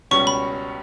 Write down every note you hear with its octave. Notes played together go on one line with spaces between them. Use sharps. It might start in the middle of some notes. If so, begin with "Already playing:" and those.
C#2 B2 G3 C#4 C#6
B5